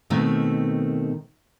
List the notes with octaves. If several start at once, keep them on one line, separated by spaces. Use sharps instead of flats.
B2 D#3 A3 C4